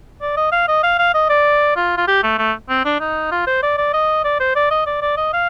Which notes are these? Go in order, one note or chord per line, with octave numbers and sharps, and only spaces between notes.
D5
D#5
F5
D#5
F5
F5
D#5
D5
F4
F4
G4
A3
A3
C4
D4
D#4
F4
C5
D5
D5
D#5
D5
C5
D5
D#5
D5
D5
D#5
F5